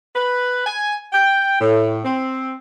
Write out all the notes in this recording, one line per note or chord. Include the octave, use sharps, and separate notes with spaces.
B4
G#5
G5
A2
C4